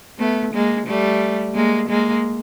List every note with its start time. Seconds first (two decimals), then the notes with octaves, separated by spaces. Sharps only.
0.19 A3 B3
0.54 G#3 A#3
0.87 G3 A3
1.55 G#3 A#3
1.89 G#3 A#3